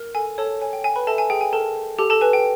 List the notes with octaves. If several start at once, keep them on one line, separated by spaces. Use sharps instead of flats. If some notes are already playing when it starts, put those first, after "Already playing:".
Already playing: A#4
A4 G#5
A4 C#5 A5
C#5 G#5
G5
C#5 G#5
B4 B5
A4 E5 A5
G#5
G#4 G5
G#5
A4 A#4 A5
A#4
G4 A4 A5
A4 A5
B4 G#5
G5